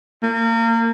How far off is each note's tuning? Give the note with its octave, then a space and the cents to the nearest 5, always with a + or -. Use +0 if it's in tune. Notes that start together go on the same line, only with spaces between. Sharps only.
A#3 -30